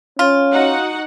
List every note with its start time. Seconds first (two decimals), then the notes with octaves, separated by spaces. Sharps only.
0.19 C#4 F4
0.52 D#4 F#4 F#5